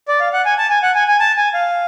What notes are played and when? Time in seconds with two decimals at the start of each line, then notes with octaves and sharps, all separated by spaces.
0.08 D5
0.20 F5
0.33 F#5
0.45 G#5
0.58 A5
0.70 G#5
0.83 F#5
0.95 G#5
1.08 G#5
1.20 A5
1.37 G#5
1.54 F5